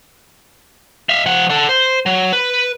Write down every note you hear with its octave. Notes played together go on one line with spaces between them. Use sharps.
E5 F5
F3 F#5
A4 F#5
C5
F#3
B4